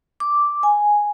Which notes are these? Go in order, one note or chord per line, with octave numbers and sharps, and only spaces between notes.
D6
G#5